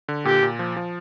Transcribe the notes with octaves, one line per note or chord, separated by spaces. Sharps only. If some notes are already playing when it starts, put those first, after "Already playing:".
D3
A#2 G4
A#2
F3
F3